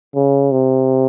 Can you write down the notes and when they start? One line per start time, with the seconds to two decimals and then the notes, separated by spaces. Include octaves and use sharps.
0.16 C#3
0.52 C3